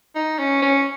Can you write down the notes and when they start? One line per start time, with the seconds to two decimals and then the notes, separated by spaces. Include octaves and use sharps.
0.15 D#4
0.39 C#4
0.62 C#4